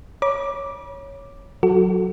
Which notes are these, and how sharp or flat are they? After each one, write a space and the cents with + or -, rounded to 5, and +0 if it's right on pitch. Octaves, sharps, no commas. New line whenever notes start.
C#5 +0 B5 -40 D6 +0
F#3 +0 F#4 +0 A4 +0